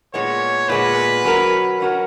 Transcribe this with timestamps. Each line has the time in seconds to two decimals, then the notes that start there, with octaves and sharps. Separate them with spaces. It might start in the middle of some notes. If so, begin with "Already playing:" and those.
0.14 A#2 G#3 B3 C#5
0.69 A#2 G#3 B3 B4
1.25 F#3 C#4 F#4 A#4
1.80 F#3 C#4 F#4 A#4